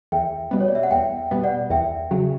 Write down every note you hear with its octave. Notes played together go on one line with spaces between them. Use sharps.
E2 E5 G5
B2 G3 B3
C#5
D5
E5
F#5
E2 E5 G5
B2 G3 B3
D5 F#5
E2 E5 G5
C#3 F#3